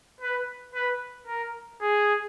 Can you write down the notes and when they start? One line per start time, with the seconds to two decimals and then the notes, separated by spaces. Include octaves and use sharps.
0.20 B4
0.74 B4
1.27 A#4
1.81 G#4